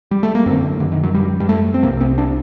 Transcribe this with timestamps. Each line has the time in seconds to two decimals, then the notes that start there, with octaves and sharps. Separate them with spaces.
0.11 G3
0.23 A3
0.35 A#3
0.46 F#2 D3 C4
0.80 D3
0.92 D#3
1.03 F#3
1.14 G3
1.40 G3
1.49 A3
1.74 C4
1.83 C2 C3 A#3
2.01 C4
2.18 D4